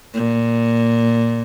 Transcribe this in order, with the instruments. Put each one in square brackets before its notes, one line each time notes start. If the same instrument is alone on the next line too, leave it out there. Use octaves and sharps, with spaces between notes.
[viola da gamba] A#2